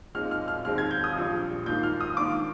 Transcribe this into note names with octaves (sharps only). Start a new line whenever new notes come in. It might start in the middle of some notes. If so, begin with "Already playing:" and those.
A#2 G#3 C4 D#4 F6
F6
F6
D#2 D#3 G#3 C4 F6
G#6
G6
D#6
A#1 A#2 G3 D4 F4
G#2 D#3 A#3 F4 G6
F6
D#6
G#2 D#3 A#3 D4 F4 D6